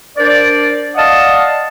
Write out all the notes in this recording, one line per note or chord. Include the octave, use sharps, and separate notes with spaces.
D4 A#4 C5 D5
D5 D#5 F5 F#5 A5 D#6